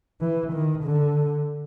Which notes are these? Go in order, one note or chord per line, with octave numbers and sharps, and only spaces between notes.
E3
D#3
D3